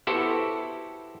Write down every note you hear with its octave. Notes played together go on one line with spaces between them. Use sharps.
B3 E4 F#4 G4 A4 C5